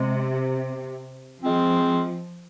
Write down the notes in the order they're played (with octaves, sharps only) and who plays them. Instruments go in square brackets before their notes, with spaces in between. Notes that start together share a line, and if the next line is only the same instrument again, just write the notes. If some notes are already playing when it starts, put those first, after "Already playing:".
Already playing: [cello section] C3 [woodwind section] G#3
[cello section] F3 [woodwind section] G#3 C4 F4